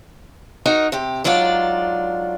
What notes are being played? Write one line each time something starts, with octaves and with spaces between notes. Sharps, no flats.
D#4 F#4 A#4 D#5
C3 G4
G#2 F#3 D4 F4 D5